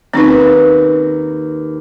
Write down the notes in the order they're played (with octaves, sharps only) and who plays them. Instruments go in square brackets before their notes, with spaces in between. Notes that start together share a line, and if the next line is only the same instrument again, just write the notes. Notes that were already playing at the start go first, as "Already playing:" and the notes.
[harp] D#2 B4 [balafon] C4 C#4 D#4